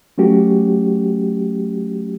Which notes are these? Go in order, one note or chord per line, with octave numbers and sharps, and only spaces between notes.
F#3 A3 C#4 F#4 G4